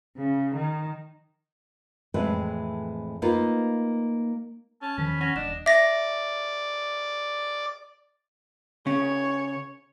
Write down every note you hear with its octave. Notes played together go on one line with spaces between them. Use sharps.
C#3
D#3
F2 A2 E3 G#3 C4 B4
A#3 D#4 F4 B4
C#4 A5
E2 D#3 F3 B5
C#4 F#5 A#6
D#1 D4 D#5 E7
D5 E5 A#6
C#3 C#4 C#5